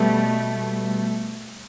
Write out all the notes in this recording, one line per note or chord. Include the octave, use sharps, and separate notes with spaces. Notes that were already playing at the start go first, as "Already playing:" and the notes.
Already playing: B2 G3 A3